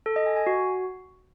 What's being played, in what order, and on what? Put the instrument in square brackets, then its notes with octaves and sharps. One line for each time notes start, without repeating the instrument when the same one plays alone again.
[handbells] A4
D#5
G#5
G#5
F#4